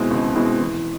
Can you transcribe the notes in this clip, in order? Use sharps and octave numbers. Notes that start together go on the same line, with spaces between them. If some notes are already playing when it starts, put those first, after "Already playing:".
Already playing: B2 G#3 C4 E4
C#2
B2 G#3 C4 E4
E3